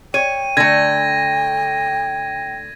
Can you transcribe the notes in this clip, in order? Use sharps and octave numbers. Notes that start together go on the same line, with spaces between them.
C#5 G5 D#7
D3 A3 G#6 A#6